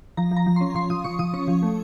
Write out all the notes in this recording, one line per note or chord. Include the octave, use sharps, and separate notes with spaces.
F3 A#5
F3
A#5
F3
C#4 C6
F3 C6
F3 D#6
F3 C#6
F3 D#6
C#4 C#6
F3
A3